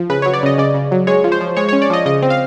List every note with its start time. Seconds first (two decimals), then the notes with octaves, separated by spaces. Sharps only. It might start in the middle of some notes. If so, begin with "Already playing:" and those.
Already playing: F3
0.10 C#3 B4
0.22 F#3 C#5
0.33 D5
0.43 C#3 D#5
0.58 C#3 D5
0.74 C#3
0.91 F#3
1.07 G#3 C#5
1.24 F3
1.32 C5
1.41 F3
1.56 G#3 C#5
1.69 C#4 C#5
1.82 D5
1.90 F3 D#5
2.06 C#3 D#5
2.22 C4
2.30 F5